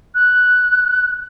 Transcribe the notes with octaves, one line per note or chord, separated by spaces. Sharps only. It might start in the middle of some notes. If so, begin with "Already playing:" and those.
F#6